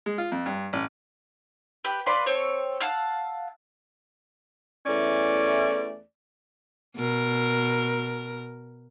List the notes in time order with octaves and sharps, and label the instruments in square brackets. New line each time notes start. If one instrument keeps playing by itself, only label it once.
[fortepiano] G#3
F4
F2
G2
A1
[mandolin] G4 B4
B4 D5 F5 C6
C4 A4 C#5
F5 F#5 A5 E6
[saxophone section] E2 E3 A3 C#4 D5
[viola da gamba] B2 A#4